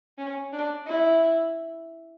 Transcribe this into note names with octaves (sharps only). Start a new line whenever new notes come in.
C#4
D4
E4